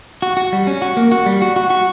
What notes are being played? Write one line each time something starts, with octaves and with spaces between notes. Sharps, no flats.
F#4
F#4
G3
C#4
F#4
A#3
F#4
G3
F#4
F#4
F#4